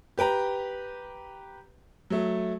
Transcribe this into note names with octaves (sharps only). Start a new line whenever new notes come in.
G4 B4 G5 A#5
F#3 A3